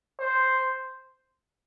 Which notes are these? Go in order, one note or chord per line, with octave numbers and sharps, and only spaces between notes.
C5